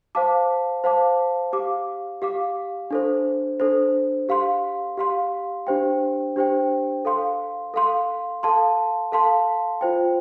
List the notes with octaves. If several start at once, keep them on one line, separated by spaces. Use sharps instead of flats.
C5 F5 A5 D6
C5 F5 A5 D6
G4 F5 D6
G4 F5 D6
D4 A4 C5
D4 A4 C5
G4 F5 C6
G4 F5 C6
D4 G4 C5 G5
D4 G4 C5 G5
A4 F5 C6
A4 F5 C6
A4 F5 A5 C6
A4 F5 A5 C6
F4 C5 G5